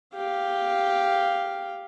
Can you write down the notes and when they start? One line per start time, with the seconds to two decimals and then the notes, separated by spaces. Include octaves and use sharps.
0.15 G4 F5